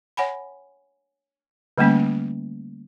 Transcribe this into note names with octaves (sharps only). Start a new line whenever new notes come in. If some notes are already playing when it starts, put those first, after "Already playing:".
C#5 F#5 G#5 B5
D3 G3 A3 A#3 C#4